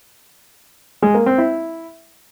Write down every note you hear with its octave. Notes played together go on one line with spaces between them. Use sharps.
G#3
A#3
C4
E4